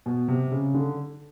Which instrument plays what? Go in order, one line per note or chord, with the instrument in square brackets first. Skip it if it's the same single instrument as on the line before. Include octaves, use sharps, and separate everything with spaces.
[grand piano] B2
C3
C#3
D3